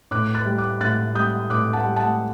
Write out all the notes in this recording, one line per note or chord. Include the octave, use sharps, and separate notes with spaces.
A2 D6 F#6
F#6 A6
G3
D6 F#6
A2 F#6 A6
G3 D#6 G6
A2 D6 F#6
F#5 A5
G3
F#5 A5